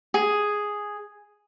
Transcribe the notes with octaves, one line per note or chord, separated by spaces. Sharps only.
G#4